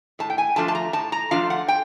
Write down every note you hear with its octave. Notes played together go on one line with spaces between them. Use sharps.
A2 A5
G5
G#5
F3 A3 D4 F4 A5
A5
A#5
A2 A5
A#5
F3 A3 D4 F4 F5
F#5
G5